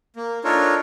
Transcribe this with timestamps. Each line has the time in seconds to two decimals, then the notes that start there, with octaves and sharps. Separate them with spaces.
0.16 A#3
0.44 D4 D#4 F4 A4 A#4 C#5